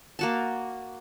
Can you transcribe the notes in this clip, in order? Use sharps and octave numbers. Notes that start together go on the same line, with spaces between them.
A#3 F#4 A5